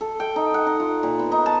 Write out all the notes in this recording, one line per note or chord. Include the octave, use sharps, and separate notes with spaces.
A4
G5
D#4
F#5
D#4
F4
A#2
B3
D#4
A5